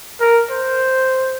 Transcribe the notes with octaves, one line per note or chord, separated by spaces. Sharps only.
A#4
C5